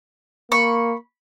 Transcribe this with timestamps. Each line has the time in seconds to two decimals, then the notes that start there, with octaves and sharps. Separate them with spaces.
0.52 A#3 B5 C#6